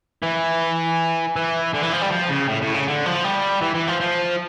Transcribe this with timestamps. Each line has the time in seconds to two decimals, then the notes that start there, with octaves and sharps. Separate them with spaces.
0.23 E3
1.36 E3
1.74 D3
1.83 E3
1.93 F3
2.02 G3
2.12 F3
2.30 C#3
2.49 A2
2.62 A2
2.74 C#3
2.88 D3
3.06 F3
3.24 G3
3.62 E3
3.75 E3
3.89 F3
4.01 F3